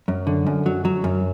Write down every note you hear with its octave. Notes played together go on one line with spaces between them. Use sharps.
F#2
D3
F#2
F#3
F#3
F#2